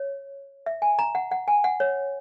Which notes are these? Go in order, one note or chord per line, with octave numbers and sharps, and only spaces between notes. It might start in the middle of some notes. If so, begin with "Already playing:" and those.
Already playing: C#5
E5
G#5
A#5
F#5
F#5
G#5
F#5
C#5